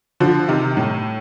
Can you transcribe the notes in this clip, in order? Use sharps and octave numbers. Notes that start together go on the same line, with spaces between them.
D3 F3
C3 D#3
A2